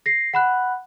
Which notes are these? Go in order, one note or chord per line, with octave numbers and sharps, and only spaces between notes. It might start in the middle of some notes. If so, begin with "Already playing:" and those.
A#6 C7
F#5 B5 F#6